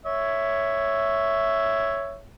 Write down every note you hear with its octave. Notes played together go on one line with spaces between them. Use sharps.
C#5 E5